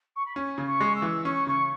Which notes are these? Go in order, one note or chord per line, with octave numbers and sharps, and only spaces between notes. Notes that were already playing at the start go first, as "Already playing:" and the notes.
C#6
B5
C#4 G#5
C#3
C#6
G#3
E6
E3
C#4 C#6
C#3 C#6